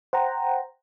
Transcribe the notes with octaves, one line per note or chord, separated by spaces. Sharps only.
C5 F#5 G5 A#5